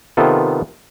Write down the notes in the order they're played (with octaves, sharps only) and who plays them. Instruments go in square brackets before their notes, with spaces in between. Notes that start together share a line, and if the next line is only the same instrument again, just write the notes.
[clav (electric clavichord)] C3 D#3 B3 F4 A4